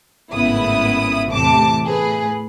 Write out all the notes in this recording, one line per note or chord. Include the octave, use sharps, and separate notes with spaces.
G#1 A2 C#3 B3 E4 D#6
E2 A2 C3 A5 D6
A2 G#4 B4